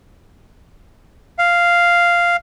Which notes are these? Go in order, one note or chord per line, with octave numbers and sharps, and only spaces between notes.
F5